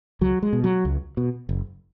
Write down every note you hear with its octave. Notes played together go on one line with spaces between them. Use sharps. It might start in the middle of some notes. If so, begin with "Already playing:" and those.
C#2 F#3
G#3
B2
F#3
C#2
B2
F#1